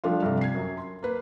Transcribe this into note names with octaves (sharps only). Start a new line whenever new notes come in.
F3 G3 A3 D4 F4
G2 C3 A4
G#6 C7
F#2 F#3
C6
A#3 B4